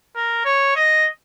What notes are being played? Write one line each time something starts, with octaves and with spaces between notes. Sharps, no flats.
A#4
C#5
D#5